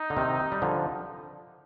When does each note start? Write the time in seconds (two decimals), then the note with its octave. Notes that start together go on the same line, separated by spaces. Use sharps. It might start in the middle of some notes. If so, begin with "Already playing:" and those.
Already playing: D#4
0.10 D3
0.17 C3 D#3
0.52 G3
0.62 D3 F3